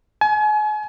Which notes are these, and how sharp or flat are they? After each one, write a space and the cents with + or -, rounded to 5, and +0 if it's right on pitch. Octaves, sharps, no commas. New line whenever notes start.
G#5 +35